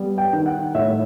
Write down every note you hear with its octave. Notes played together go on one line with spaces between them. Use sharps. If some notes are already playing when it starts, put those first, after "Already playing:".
Already playing: G3 B3
G5
D#3
F#5
A2 E5